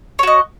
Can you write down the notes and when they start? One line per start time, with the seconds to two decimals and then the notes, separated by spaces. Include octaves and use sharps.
0.19 C#5
0.23 F#4
0.27 D#5